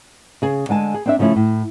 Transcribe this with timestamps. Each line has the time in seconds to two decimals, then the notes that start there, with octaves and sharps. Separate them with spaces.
0.42 C#3 G#4
0.69 D3 G#3 G#5 A5
0.94 G#4
1.06 C4 D4 E5
1.19 C#3 F3 A3 C#4 E4
1.36 A2